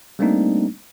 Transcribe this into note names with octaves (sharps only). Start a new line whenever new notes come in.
G3 A3 A#3 C4 D4 D#4